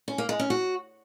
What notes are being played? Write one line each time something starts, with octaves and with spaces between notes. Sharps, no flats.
C#4
A#3
G#3
C#4
F#4